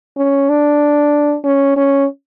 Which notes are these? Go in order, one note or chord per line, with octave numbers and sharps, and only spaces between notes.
C#4
D4
C#4
C#4